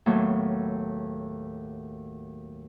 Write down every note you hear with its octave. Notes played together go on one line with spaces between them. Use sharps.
D#2 A2 F#3 A3 B3 C#5